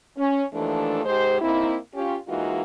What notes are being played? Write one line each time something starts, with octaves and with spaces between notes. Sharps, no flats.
C#4
D#2 E3 F3 A3 D4 A4
G#2 G#3 G4 C5
A#3 C4 D#4 E4
C#4 F4 G4
E3 G#3 A#3 D#4 F4 F#4